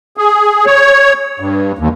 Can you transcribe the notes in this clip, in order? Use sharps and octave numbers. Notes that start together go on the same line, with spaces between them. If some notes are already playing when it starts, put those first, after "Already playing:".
G#4
C#5
G2
D#2